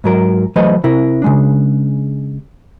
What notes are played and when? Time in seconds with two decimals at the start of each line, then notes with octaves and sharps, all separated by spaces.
0.04 G#2 F#3 A#4
0.56 E3 F#3 A3 B4 C5 D#5
0.84 C3 E4 A#4
1.22 C#3 G#3 D4